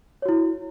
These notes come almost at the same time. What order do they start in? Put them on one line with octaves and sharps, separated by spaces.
C#5 F#4 E4